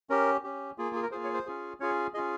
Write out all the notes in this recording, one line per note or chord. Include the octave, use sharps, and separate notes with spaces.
C#4 G4 A#4
C#4 G4
A#3 F4 G#4
G#4
A#4
A#3 F4 G#4 C5
C#5
C5
C#4 F4 G#4
C#4 F4 G#4 C#5
C#4 F4 G#4 D#5